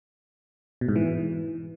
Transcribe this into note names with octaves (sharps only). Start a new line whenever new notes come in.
B2
G#2
E3